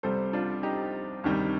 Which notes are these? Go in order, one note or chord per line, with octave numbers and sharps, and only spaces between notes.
C2 C3 G3 A4 C5
D4 F4
D#4 G4
D2 C3 D#3 G3